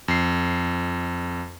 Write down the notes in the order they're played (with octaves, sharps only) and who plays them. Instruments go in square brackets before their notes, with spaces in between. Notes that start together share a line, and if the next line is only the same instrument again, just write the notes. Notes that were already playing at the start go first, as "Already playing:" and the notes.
[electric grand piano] F2 C7